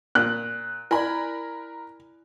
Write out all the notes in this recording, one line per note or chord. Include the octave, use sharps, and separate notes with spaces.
A#2 F#6
E4 A#4 D5 G#5 B5